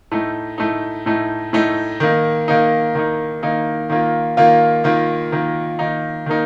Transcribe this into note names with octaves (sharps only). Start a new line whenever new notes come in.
A2 A3 D#4
A2 A3 D#4
A2 A3 D#4
A2 A3 D#4
D#3 A#3 D#4
D#3 A#3 D#4
D#3 A#3 D#4
D#3 A#3 D#4
D#3 A#3 F4
D#3 A#3 F4
D#3 A#3 F4
D#3 A#3 F4
D#3 A#3 D#4
D#3 A#3 D#4